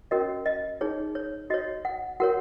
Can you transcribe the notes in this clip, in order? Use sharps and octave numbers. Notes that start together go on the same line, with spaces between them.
C#4 F#4 A#4 C#5 D#5
D#5
D#4 G#4 C#5
C#5
F#4 C#5 D#5
F#5
F#4 A#4 C#5 F#5